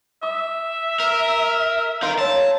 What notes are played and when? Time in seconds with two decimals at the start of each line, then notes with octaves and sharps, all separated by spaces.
0.23 E5 D6 D#6
1.00 A#4
2.02 D#4 A#4 F5 C6
2.19 C#5 A5 E6